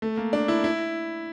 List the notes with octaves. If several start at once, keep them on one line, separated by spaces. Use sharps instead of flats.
A3
A#3
D4
E4
E4